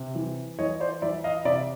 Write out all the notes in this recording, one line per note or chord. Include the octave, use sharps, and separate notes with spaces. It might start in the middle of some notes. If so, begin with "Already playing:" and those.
Already playing: C3
E3
E3 C#5 D#5
C5 D5
E3 D5 E5
D#5 F5
C3 D5 E5